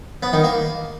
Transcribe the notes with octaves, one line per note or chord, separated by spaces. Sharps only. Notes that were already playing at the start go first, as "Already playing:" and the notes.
B3
D#3
A#3